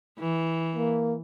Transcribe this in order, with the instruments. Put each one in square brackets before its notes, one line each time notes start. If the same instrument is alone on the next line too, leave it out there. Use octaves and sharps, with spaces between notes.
[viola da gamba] E3
[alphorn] A#3